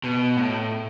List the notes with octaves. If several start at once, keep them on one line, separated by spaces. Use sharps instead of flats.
B2
A2